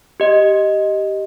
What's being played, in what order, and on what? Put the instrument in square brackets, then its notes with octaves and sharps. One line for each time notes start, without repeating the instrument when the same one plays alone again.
[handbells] G4 D#5